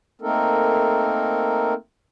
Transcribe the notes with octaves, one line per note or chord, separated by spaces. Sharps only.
A3 A#3 C4 D#4 A4 A#4